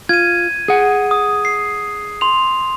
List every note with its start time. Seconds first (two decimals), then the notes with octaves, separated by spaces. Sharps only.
0.09 F4 G#6 D#7
0.68 G#4 F#5
1.11 D#6
1.45 C7
2.21 C6 F7